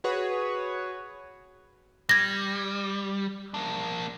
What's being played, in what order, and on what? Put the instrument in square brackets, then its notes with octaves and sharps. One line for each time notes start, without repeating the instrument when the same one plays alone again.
[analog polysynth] F#4 G#4 B4 C#5
[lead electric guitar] G3 [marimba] G#6 A#6
[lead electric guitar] A#3 D4